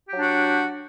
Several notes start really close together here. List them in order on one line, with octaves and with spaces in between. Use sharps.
G4 F#3 D4 F#4